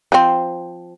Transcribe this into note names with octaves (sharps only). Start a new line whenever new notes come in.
F3 C4